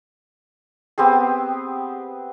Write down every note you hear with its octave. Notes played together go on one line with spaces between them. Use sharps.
B3 C4 G4 G#4